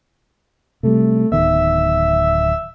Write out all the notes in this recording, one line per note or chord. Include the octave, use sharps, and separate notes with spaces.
C3 G3 A3
D1 D#3 B3 E5